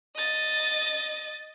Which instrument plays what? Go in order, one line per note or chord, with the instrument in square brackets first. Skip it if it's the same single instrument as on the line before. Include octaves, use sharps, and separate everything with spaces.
[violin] D#5 A6